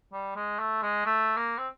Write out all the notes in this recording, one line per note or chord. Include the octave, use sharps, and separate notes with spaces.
G3
G#3
A3
G#3
A3
A#3
C4